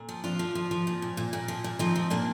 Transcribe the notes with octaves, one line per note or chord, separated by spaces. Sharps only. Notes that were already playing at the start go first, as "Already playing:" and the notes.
Already playing: A#2
F3
F3 D4 F4
F3
F3
F3
A#2
A#2
A#2
A#2
F3
A#2
F3 C4 D#4
F3
A#2 A#3 D4